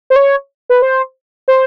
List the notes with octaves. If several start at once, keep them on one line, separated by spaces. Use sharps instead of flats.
C5
C#5
B4
C5
C5